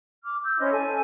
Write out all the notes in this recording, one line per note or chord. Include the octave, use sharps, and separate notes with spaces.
D6 F6
E6 G6
C#4 E4 C5 D#5
A4 G#5